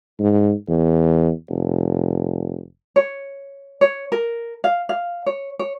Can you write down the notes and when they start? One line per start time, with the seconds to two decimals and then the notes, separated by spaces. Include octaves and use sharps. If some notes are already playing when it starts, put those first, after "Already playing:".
0.19 G#2
0.69 E2
1.49 F1
2.96 C#5
3.81 C#5
4.12 A#4
4.64 F5
4.89 F5
5.26 C#5
5.59 C#5